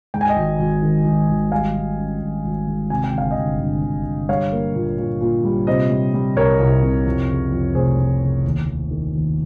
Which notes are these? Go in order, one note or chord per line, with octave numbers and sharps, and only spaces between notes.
G#2 G5
G#5
D#5 G5
G#1
G#1
D#3
G#1
G#1
G3 F5 G#5
G#1
C#4
G#1
G#1
G#2
C3 G#5
G5
G1 F5
D#5 G5
G1
G1
G1
G1
G3 C#5 F5
A#3
A#2
A#2
A#2
G3
C3 C5 D#5
G3
G3
C2 A#4 C#5
C2
C3
F2
C#3
F2
F1 G#4 C5
F1
C#3
D#2
D#2
D#3
D#2